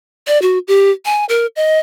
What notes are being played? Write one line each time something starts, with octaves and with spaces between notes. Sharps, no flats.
D5
F#4
G4
G#5
A#4
D#5